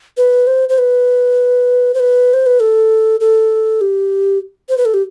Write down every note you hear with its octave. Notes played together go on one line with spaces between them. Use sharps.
B4
C5
C5
B4
C5
B4
C5
B4
A4
A4
G4
C5
B4
A4
G4